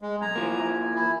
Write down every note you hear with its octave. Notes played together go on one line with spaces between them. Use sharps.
G#3
B1 G#5 A#5
E3 F3 A#3
E4 G#5